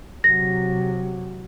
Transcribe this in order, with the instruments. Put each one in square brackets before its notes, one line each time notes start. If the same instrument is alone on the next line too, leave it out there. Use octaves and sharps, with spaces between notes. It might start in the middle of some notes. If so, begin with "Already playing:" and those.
[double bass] C3 F#3 [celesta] A#6